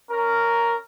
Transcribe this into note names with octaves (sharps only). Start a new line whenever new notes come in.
C#4 A#4